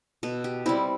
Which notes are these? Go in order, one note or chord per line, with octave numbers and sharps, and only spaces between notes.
B2 A4
G4
G3 C4 E4